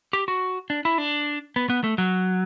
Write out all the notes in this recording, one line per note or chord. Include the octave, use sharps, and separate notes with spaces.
G4
F#4
D4
E4
D4
B3
B3
A3
F#3